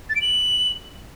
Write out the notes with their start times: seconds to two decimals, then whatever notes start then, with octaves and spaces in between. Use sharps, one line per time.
0.10 A6
0.15 D7
0.21 F#7